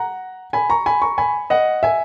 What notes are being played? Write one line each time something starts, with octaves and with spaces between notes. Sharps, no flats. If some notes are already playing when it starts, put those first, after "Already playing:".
Already playing: F#5 A#5
G#5 B5
A#5 C#6
G#5 B5
A#5 C#6
G#5 B5
D#5 F#5
E5 G#5